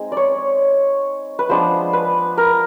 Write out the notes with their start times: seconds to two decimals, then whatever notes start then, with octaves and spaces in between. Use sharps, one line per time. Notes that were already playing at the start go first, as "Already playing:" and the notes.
Already playing: G#3 C4 D#4
0.12 D5
0.17 C#5
1.39 B4
1.49 F3 G#3 B3 D4 C5
1.93 B4
2.38 A#4